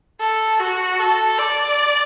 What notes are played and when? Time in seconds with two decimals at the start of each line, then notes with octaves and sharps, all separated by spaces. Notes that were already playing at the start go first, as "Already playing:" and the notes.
0.20 A4
0.60 F#4
0.99 A4
1.39 D5